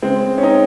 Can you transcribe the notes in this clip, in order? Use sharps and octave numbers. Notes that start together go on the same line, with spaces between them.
C#3 G#3 C4
C#4
C4 D#4